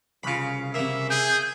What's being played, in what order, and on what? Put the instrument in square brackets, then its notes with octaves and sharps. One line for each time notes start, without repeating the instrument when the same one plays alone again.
[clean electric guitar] C2 C#3 [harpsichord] F4 B5
[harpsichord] C3 A#3 [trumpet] E5
[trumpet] G#4 [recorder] G6